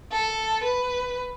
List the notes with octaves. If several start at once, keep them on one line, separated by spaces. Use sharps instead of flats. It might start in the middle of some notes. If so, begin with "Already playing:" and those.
A4
B4